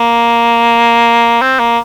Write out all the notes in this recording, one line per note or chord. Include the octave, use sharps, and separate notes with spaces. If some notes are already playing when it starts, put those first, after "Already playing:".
Already playing: A#3
C4
A#3